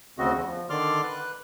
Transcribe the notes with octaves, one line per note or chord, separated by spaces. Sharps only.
D2 C#3 C4 F#4 D#5
E2
F3
D3 D#3 D5 C6 D6 F6
B4 F#6